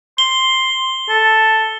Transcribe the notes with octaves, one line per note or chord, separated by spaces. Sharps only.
C6 G7
A4